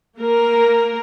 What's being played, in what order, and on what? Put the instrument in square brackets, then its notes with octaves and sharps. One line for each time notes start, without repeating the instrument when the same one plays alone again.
[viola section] A#3 A#4